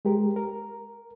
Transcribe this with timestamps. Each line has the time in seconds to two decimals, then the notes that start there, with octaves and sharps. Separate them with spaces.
0.05 G#3 G4 A#4
0.36 A#4